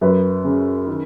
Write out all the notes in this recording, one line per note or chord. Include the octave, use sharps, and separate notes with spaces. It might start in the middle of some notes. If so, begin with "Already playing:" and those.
F#2 B4
C#3
D#3